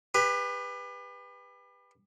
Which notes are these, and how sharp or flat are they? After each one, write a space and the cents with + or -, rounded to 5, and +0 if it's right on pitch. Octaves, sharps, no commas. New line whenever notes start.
G4 +35 B4 +0